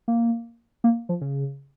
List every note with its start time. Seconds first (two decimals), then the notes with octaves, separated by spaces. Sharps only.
0.08 A#3
0.84 A#3
1.09 F3
1.21 C#3